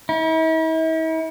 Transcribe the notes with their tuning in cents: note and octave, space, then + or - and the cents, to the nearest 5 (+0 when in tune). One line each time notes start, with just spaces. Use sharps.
E4 -45